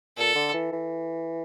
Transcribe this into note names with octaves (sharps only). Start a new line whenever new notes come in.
A#2 A4
D3
E3
E3